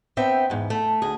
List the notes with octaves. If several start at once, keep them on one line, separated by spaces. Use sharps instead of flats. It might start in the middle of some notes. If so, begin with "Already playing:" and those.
B3 C4 E5 G5
E2 G#2
A3
D2 G#4